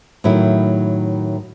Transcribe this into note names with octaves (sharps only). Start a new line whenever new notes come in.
A2 D#3 F#3 E4